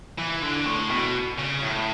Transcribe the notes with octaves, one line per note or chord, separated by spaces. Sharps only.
E3
D3
A2
B2
C#3
A2